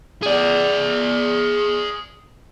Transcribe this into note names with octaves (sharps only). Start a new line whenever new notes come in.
G#4 D5